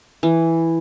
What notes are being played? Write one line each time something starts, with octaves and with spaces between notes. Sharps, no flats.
E3